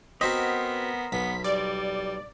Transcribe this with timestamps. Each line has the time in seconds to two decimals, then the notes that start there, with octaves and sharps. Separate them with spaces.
0.21 B3 C4 F#4 A#4 C5 D#5 B6
1.12 B1 B3 B6
1.44 G3 D5